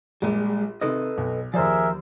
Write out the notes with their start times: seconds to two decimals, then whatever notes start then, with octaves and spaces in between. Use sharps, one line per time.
0.22 A#1 G3 G#3
0.81 C3 D#3 A4 B4 D#5
1.17 B1
1.54 D#2 F3 G#4 A#4 C5 D5 E5